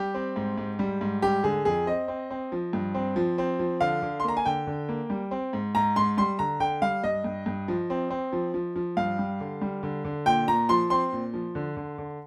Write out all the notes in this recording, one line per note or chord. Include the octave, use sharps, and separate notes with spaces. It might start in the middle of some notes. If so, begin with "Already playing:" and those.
Already playing: G3 G4
C4
G#2
G#2
G3
G#2
G3 G4
D3 G#4
F2 G#4
C4 D#5
C4
C4
F3
G2
C4
F3
C4
F3
D3 F5
D3
C6
A#3 A#5
G#5
D3 G5
D3
A#3
G3
C4
G#2
G#2 A#5
G#2 C6
G3 C6
D3 A#5
D3 G5
G3 F5
G2 D#5
G2
G2
F3
C4
C4
F3
F3
F3
G2 F5
G3
D3
G3
D3
D3
A#2 G5
A#2 A#5
F3 C6
C4 C6
A#2
F3
D3
D3
D3